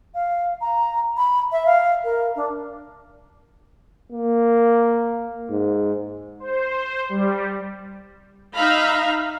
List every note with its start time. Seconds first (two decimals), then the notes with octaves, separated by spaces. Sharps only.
0.14 F5
0.60 A#5
1.17 B5
1.51 E5
1.65 F5
2.04 A#4
2.35 D4
4.12 A#3
5.49 G#2
6.40 C5
7.09 G3
8.54 D#4 E5 F5 A#5 B5